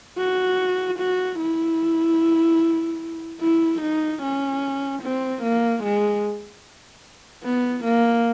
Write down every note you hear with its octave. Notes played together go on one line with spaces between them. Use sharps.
F#4
F#4
E4
E4
D#4
C#4
C4
A#3
G#3
B3
A#3